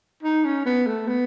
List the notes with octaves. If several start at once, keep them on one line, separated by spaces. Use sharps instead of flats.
D#4
C#4
B3
A3
B3